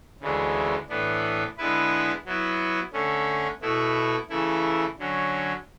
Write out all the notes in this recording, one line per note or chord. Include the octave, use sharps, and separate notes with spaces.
D2 C#3 E3 G#3 D4
A2 E3 B3 D4
D3 G#3 B3 E4 B4
F#3 B3 E4
D3 A3 C#4
B2 A3 E4
C#3 E3 A3 E4
D3 F#3 C#4